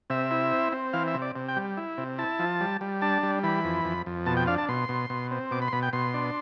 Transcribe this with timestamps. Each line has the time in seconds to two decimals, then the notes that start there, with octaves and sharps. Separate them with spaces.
0.10 C3 E5
0.31 E4
0.53 C4
0.73 C4
0.93 E3 F5
1.08 E5
1.14 C3
1.22 D5
1.36 C3
1.48 G5
1.57 G3
1.77 E4
1.98 C3
2.18 E4 A5
2.39 F3
2.61 G3
2.81 G3
3.02 D4 A5
3.23 G3
3.43 E3 B5
3.64 F2
3.85 F2
4.06 F2
4.26 B2 A5
4.37 G5
4.47 D4 F5
4.58 A5
4.68 B2 C6
4.89 B2
5.10 B2
5.31 C4
5.51 B2 D6
5.62 B5
5.68 C6
5.73 B2 B5
5.83 G5
5.93 B2 C6
6.14 D4